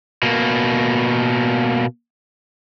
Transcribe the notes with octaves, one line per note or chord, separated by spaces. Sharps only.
B2 A#3